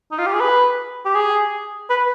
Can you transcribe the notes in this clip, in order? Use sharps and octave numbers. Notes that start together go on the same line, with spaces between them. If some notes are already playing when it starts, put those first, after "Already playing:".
D#4
F4
G4
G#4
B4
G4
G#4
B4